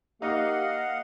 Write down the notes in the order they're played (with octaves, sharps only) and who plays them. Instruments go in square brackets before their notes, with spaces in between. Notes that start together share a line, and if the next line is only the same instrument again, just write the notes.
[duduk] A#3 [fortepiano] D#4 [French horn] G4 [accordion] D#5 F5 F#5